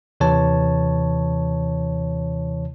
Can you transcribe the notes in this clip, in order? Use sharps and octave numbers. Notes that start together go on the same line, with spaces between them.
D#2 C3 E3 C#5 A5